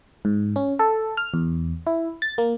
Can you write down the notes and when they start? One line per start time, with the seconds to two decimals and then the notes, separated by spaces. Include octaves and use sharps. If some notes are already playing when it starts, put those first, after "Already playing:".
0.25 G#2
0.56 C#4
0.79 A4
1.17 F6
1.34 E2
1.87 E4
2.22 A6
2.38 A#3